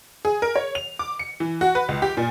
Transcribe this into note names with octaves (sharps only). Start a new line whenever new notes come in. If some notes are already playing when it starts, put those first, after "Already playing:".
G#4
A#4
C#5
F7
D6
C#7
E3
F#4
B4
C#2
G4
A#2